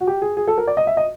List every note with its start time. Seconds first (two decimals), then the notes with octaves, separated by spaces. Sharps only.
0.01 F#4
0.07 G4
0.22 G#4
0.37 G#4
0.48 A4
0.58 A#4
0.67 D5
0.77 D#5
0.87 E5
0.97 D#5